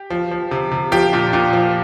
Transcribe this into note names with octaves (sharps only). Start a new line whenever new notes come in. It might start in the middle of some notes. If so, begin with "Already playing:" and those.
Already playing: G4
F3
F3
C3
C3
F3 G4
A#2
A#2
F3